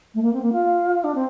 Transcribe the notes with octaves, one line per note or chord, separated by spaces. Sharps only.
A3
A#3
C4
A#3
F4
D4
C4